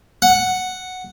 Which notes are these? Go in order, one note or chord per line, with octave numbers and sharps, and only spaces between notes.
F#5